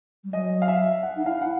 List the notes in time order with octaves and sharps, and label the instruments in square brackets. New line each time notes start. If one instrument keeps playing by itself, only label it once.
[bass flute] G3
[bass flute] F#3 [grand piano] D#5
[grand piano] F5
E5
F#5
[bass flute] D#4
[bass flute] E4 [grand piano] F5
[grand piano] F#5